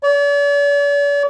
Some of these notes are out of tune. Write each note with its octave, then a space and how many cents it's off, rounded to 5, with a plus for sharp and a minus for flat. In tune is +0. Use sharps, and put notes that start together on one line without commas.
D5 -45